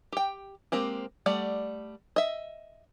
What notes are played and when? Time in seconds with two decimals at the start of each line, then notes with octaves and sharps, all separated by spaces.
0.13 G4 G5
0.72 G#3 A#3 C4 G4
1.26 G3 A3 D5 F#5
2.16 D#5 E5